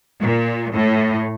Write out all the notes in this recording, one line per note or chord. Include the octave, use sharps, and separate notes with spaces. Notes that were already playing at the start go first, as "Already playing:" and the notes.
A#2
A2